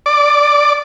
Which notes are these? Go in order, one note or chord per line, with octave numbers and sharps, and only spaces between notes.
D5